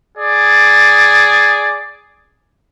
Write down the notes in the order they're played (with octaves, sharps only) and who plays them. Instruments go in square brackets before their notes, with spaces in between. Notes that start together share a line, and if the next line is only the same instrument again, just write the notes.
[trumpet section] G#4 D5